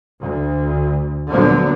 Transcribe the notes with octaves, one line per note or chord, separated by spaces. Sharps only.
D2
A#2 D3 F3 F#3 A3 B3